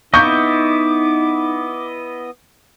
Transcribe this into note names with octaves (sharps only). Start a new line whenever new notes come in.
B3 D#4 E4 D#5 C#6 D6 G6